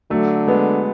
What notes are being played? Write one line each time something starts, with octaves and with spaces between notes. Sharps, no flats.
D3 F#3 A3
G#3 B3